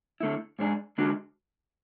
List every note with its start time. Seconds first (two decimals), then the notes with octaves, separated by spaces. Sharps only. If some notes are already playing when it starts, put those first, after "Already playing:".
0.20 D3 A3 E4
0.59 G#2 G#3 D4 G#4
0.98 D3 G#3 D4 F#4